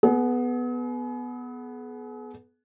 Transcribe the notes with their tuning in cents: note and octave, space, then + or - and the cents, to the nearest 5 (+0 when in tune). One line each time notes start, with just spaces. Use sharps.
B3 +0 G#4 +40